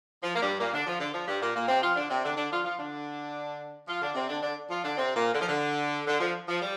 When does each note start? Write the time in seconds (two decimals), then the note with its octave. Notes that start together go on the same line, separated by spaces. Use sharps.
0.23 F3
0.35 A#3
0.41 G2 G3
0.60 A#2 A#3
0.73 D3 D4
0.86 F3
1.00 D3
1.14 F3
1.28 G2 G3
1.41 A#2 A#3
1.55 A#2 A#3
1.68 C3 C4
1.82 F3 F4
1.96 D3 D4
2.10 C3 C4
2.24 D3 D4
2.37 D3 D4
2.51 F3 F4
2.64 F3 F4
2.78 D3 D4
3.88 F3 F4
4.01 D3 D4
4.14 C3 C4
4.29 D3 D4
4.42 D3 D4
4.70 F3 F4
4.83 D3 D4
4.97 C3 C4
5.15 A#2 A#3
5.33 D3
5.41 F3
5.48 D3
6.07 D3
6.20 F3
6.48 F3
6.62 G3